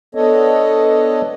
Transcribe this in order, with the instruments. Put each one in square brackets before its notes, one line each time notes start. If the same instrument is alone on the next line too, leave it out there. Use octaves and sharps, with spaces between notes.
[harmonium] B3 D4 A4 C#5 D#5